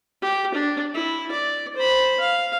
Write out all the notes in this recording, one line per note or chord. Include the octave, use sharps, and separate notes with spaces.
G4
D4
E4
D5
C5 B5
F5